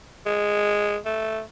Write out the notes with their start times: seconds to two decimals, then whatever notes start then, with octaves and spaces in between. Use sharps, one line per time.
0.26 G#3
1.05 A3